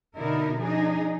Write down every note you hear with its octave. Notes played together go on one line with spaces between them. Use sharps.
B2 D3 D#4 E4 A#4
F3 D4 D#4 G#4